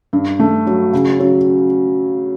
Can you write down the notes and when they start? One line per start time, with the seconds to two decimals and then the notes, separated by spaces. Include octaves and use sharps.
0.13 G2
0.40 A3
0.67 F#3
0.93 C#3
1.20 F#3